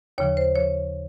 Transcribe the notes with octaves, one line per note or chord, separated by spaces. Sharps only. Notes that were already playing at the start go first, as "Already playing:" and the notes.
D#2 C#3 F3 C#5
C5
C#3 F3 C#5